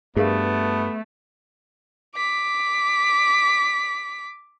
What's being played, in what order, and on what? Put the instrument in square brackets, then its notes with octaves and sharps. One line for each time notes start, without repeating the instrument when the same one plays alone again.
[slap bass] G2 [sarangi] A3 [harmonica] B3 [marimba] G#4 A#4 F5
[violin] D6 B6